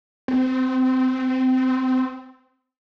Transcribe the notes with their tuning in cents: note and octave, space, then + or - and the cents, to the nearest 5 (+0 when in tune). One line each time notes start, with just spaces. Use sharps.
C4 -20